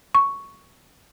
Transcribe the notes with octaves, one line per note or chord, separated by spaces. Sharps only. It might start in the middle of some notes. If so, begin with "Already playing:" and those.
C#6